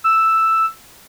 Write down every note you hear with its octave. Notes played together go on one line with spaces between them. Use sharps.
E6